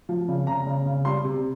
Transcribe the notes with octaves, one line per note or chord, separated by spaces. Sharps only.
F3
C#3
C#3 A#5
C#3
C#3
G3 C6
C3